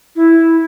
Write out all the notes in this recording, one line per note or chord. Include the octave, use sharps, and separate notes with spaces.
E4